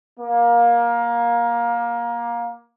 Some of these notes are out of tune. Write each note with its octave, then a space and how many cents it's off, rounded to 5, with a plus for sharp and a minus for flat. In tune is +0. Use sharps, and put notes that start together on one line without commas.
A#3 +20